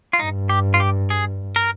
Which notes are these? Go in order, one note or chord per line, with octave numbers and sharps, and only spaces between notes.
F4
G2 D#4
G4
F4
G4
G#4
A#4